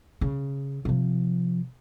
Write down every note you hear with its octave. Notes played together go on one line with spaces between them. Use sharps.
C#3
C3 F3